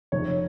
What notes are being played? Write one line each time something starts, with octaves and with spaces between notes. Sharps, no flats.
F1 C#5